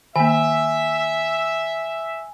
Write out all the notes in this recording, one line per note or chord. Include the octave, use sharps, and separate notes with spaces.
D#3 A#3 E5 G#5